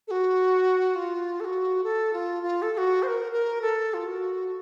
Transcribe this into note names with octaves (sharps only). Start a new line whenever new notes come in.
A4
F#4
F4
A4
F#4
A4
F4
F4
A4
A4
F#4
C5
A#4
A#4
A4
F4
F#4